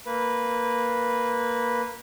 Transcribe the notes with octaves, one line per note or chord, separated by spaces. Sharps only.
A#3 B4